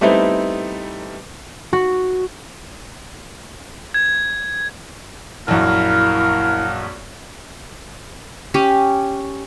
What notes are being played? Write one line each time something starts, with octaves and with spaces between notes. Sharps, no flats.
G3 A3 B3 C4 D#4 E4
F#4
G#6
A#1 F#2 E4 A#4 F5
C#4 G4